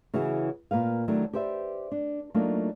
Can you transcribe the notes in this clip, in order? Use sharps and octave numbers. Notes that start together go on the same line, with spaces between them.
C#3 E3 C#4 E4 F#4
A#2 A#3 B4 F5
D#3 F#3 A3 D4 E4
G4 B4 C5 D5 E5
D4
F#3 A3 A#3 D4 D#4 F4